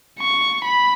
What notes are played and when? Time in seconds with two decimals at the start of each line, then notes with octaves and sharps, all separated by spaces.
0.20 C#6
0.64 B5